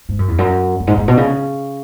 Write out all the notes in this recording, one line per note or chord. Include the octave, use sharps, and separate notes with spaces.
G#2
F#2
E2
F#2
F#2
G#2
G#2
B2
C#3